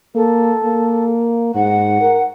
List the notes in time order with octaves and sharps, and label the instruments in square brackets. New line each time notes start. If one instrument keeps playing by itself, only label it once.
[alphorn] A#3 [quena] A4
[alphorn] A#3
[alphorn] G#2 [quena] F#5
[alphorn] A#4